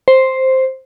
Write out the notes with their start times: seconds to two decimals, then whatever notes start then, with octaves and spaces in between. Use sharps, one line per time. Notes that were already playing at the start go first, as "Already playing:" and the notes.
0.08 C5